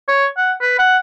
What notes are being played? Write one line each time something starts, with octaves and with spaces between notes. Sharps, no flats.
C#5
F#5
B4
F#5